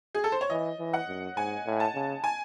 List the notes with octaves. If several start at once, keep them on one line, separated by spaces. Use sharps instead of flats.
G#4
A4
C5
C#5
E3 D#5
E3
F#5
F#2
G#2 G#5
A2
A5
C#3
G#5